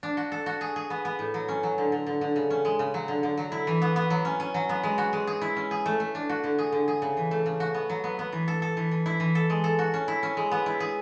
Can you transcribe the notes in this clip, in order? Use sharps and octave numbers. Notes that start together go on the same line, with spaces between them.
D4
F#4
A4
F#4
G#4
G#4
B3
B3
A2
F#3
C#4
F#3
D3
D3
D3
D3
C#3
C#4
G#3
C#3
F#3
D3
D3
F#3
E4
E3
B3
B3
F#3
C#4
C#4
F#3
B3
G#3
F#4
G#3
G#4
E4
C#4
G#4
A3
A3
D4
F#4
D3
G#4
D3
G#4
C#3
E3
A3
C#3
F#4
B3
F#3
B3
B3
E3
A4
A4
E3
E3
E4
E3
A4
G#3
A4
F#4
C#4
E4
C#4
G#3
B3
E4
G#4